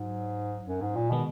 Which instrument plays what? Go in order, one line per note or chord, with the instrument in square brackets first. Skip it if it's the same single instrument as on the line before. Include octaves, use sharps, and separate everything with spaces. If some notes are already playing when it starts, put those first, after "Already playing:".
Already playing: [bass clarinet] G#2 [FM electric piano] F#3
[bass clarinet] F#2
G#2
A#2
[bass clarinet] B2 [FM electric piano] D#3 G#3 B3